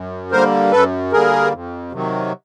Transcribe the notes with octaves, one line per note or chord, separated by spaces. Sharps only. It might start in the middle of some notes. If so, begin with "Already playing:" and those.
Already playing: F#2
D3 G3 A#3 A#4 C5
F#2 A4 B4
D3 G3 A#3 G#4 A#4
F2
C3 D#3 F#3